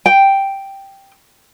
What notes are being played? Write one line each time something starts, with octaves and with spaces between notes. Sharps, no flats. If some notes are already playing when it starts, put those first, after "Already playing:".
G5